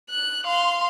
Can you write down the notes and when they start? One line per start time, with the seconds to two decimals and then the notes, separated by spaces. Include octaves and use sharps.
0.10 F#6
0.44 F5 C6